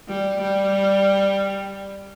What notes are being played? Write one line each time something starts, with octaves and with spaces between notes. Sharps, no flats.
G3
G3